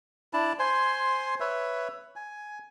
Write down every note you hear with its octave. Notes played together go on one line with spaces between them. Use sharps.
D4 E4 A5
C5 G#5 C6
B4 C#5 E5
G#5